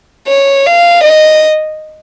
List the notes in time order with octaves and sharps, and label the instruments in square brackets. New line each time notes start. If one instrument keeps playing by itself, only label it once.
[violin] C#5
F5
D#5